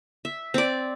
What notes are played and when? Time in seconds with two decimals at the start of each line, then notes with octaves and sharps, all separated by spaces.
0.25 E5
0.54 C4 D5